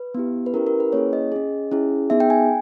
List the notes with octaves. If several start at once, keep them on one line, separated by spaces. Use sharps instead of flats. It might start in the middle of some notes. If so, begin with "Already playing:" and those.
Already playing: B4
B3 E4 G4
B4
C#4 E4 G4 A#4
A#4
B4
A#3 C#4 E4 G#4 C#5
D#5
C#4 G#4
C#4 E4 G#4
B3 D#4 G#4 E5
G5
G#5